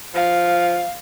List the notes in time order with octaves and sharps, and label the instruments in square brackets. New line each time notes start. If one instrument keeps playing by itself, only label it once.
[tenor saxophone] F3 [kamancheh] F5